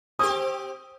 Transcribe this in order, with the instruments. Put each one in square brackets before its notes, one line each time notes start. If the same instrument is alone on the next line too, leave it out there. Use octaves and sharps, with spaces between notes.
[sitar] C4 G4 [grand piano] D#6